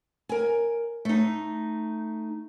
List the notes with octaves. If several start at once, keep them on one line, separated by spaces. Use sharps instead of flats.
A#4 G#5
A3 D#4